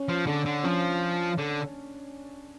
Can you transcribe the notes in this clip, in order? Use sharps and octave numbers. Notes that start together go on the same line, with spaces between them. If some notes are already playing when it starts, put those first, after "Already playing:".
Already playing: C#4
F3
D3 D4
D3
F3 C#4
D3